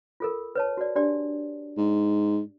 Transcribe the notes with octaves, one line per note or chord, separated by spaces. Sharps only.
F4 A4 A#4
B4 C#5 A5
F#4 D5
D4 G4 D5
G#2